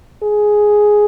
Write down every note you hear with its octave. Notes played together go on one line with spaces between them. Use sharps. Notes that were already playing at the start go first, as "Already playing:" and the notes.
G#4